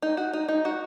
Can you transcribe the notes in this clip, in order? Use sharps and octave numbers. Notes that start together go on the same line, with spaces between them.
D#4
F#4
D#4
D#4
F#4